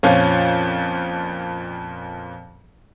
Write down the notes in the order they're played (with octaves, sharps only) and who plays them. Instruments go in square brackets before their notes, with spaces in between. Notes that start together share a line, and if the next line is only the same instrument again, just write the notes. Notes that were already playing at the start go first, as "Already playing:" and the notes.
[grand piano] F2 A#2 F3 C#4